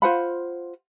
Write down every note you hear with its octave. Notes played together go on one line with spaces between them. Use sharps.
F4 C5 F#5 B5